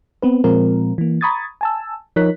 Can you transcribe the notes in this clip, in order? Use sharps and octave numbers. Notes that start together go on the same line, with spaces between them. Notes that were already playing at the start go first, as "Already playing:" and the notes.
B3 C4 B4
A#2 F3 G#3 C4 F4 A#4
E3 A#3
A#5 B5 C#6 D#6 G#6 A6
G#5 A5 E6
F3 D#4 A#4 C#5 F#6 B6